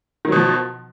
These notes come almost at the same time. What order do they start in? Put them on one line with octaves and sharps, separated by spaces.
D#3 F#3 B2 F3